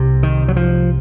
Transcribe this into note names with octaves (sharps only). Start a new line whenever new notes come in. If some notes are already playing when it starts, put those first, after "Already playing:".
Already playing: C2 C3
D#3
F#3
F3